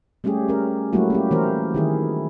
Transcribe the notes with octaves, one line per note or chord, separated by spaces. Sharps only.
G3 A3 C#4 G4 G#4
C#4 A#4
F#3 G3 A3 A#3 E4 F#4
A#3 C#4 G4
E3 A#3 A#4 C5
D#3 E4 G#4